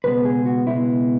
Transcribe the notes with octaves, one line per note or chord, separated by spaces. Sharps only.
C#2 B2 G#3 B3 B4
G#4
F#4
C#2 B2 G#3 B3 E4